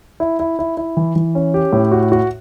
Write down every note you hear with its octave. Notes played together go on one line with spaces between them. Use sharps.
E4
E4
E4
E4
E3
E3
C#4
G4
A2
F#4
F#4